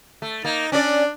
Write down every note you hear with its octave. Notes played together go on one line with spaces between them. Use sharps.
A3
A#3 D#4
C#4 D4 D5